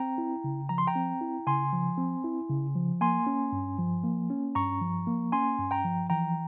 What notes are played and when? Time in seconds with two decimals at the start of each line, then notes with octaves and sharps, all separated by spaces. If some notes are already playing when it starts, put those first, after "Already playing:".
Already playing: C4 G5 A#5
0.18 E4
0.44 C#3
0.69 F3 A#5
0.78 C6
0.87 G5 A#5
0.96 C4
1.21 E4
1.47 C#3 G#5 C6
1.73 F3
1.98 C4
2.24 E4
2.49 C#3
2.75 F3
3.01 A#3 G#5 C6
3.27 C#4
3.52 G2
3.78 F3
4.04 A#3
4.30 C#4
4.55 G2 A#5 C#6
4.81 F3
5.07 A#3
5.32 C#4 G#5 C6
5.58 G2
5.71 G5 A#5
5.85 F3
6.10 E3 G5 A#5